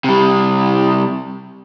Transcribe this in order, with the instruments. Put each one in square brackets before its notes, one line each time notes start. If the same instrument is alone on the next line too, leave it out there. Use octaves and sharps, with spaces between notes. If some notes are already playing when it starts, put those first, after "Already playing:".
[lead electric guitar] C3 G3